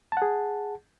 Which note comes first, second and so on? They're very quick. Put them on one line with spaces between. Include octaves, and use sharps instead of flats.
A5 F#5 G#4